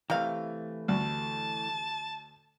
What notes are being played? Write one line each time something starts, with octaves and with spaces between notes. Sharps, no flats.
C3 E3 A3 F5
D2 A5